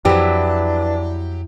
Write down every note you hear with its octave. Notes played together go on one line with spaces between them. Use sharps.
F2 E3 F#3 D4 G4